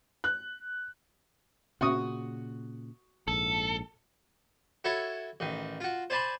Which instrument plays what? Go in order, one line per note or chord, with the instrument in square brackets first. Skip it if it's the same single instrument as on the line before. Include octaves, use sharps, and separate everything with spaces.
[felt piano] F#6
[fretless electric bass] A#2 C#3 [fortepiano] F#4 C#6 D#6
[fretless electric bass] A#1 G#2 [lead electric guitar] A4
[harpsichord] E4 F#4 A4 C#5
A1 D#3
F4 F#4
C5 D5 G#5 A5 B5 C6